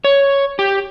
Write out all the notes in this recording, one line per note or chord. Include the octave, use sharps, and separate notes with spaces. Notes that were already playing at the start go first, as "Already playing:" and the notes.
C#5
G4